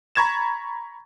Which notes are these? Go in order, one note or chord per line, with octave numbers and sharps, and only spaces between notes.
A#5 B5 C#6 G#6 A6 E7